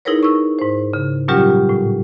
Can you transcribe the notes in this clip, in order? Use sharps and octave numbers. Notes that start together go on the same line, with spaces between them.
D#4 E4 G#4 A#4 B4 C#5
C#6 E6
G#2 C5
C#3
A#2 F#3 G3 C#4 F4 G4
A2